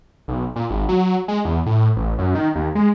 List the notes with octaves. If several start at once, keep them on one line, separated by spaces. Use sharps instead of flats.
B1
A#2
G#1
F#3
G#3
E2
A2
A1
F#2
D#3
D#2
G#3